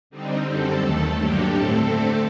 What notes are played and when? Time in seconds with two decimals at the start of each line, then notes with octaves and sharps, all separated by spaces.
0.10 D3 G3 C4 D#4
0.45 F#2 D3 G3 C4 A4
0.79 D#2 D#3 A3
1.13 G2 D3 F#3 A#3 D4 G4
1.47 A2 A3 C4 A4
1.82 D3 A3 C4